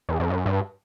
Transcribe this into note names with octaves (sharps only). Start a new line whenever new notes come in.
E2
F2
F#2
G2